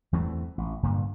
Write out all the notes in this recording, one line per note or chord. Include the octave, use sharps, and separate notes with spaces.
E2 E3 A3 C4
A1
G2 A#2 D3